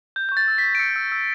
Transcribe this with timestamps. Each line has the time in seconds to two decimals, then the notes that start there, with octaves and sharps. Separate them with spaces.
0.16 G6
0.29 C#6 G6
0.37 A6
0.48 E6
0.58 B6
0.64 E6
0.75 D7
0.79 E6 C#7
0.96 E6
1.12 E6